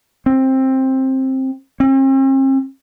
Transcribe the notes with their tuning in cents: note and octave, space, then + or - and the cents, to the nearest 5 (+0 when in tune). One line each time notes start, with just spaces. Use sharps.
C4 +15
C4 +45